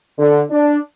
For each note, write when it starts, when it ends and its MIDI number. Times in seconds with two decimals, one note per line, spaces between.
0.18 0.41 50
0.50 0.77 62